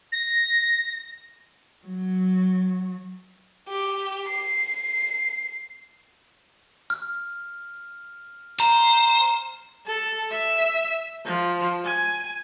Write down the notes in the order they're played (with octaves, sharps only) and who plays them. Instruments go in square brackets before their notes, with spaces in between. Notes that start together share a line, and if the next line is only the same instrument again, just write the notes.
[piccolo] A#6
[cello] F#3
[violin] G4
C7
[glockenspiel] F6
[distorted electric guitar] C5 [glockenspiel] A#5
[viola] A4
E5
F3
G#5